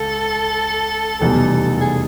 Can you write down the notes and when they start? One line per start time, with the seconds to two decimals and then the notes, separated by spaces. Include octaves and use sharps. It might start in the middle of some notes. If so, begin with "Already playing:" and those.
Already playing: C#2 A4
1.21 F1 E2 B2 G3 A4
1.77 A4
1.81 G#4